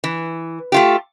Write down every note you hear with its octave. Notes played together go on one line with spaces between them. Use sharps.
E3
A3 F4 G4